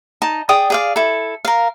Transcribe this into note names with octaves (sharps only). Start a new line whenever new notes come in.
D#4 A5
G#4 D5 G5 D#6
G#4 D5 F5
E4 A4
A#4 F5